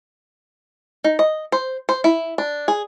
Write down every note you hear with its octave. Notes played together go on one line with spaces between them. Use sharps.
D#4
D#5
C5
C5
E4
D4
G#4